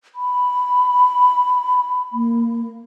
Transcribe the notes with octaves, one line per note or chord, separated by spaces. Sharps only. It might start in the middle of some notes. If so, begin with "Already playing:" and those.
B5
A#3